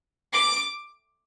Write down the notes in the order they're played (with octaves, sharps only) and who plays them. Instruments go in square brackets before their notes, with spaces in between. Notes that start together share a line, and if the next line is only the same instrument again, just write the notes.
[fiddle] D6